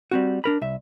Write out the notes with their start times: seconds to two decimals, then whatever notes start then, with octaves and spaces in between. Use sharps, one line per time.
0.11 G3 C4 F#4
0.44 D4 A#4 B5
0.62 C2 E5